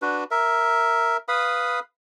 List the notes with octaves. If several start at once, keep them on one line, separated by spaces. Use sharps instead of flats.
D4 F#4 B4
A#4 E5
B4 F5 B5 D#6